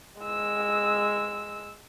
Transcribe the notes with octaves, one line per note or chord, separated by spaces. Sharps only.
G#3 E6